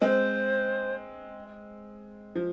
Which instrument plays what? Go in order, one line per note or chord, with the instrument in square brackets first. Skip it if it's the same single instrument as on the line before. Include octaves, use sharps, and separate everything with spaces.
[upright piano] G#3 C4 [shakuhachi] C5
[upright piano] F3